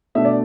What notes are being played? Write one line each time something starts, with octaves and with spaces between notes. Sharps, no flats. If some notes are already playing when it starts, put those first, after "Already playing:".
B2 A3 D4 E5
D5